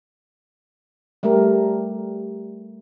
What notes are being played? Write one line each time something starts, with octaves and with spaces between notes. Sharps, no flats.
G3 A3 G4 A#4